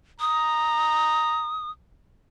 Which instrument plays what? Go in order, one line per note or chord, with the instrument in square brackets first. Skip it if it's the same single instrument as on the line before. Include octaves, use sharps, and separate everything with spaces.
[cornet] A#5 [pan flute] D#6